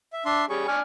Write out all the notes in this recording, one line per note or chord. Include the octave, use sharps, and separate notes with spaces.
E5
D4 E5 C6
G3 C#4 G#4 C#6
D4 G#5 F6